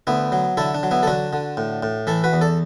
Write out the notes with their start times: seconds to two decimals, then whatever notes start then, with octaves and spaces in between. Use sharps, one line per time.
0.07 D2 B3 E4
0.32 F#3
0.57 D3 E4 A4
0.74 D4
0.83 F#3
0.91 B3 E4
1.03 A4
1.07 D3 D4 F#4
1.33 D3
1.57 A2
1.83 A2
2.07 E3 E4 A4
2.24 F#4 B4
2.33 E2
2.41 A4 D5